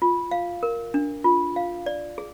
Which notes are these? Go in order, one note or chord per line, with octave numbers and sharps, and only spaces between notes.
F4
F5
A#4
D4
F4
F5
D5
G#4